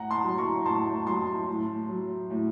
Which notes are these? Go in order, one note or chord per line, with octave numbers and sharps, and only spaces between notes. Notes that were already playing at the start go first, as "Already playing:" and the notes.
Already playing: A2 F#5 A#5
A5 C6
F#3
A#5 C#6
A2 A5 C6
F#3 A5 C6
A2
F#3
A2